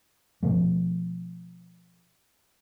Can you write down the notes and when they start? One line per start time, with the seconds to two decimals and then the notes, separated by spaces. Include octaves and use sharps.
0.43 B2 F3 A3